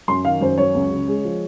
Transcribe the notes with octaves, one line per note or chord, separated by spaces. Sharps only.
F#2 C6
D#3 F5
F#2 C5
F#3 C#5
C#2
C#3
G#3
F3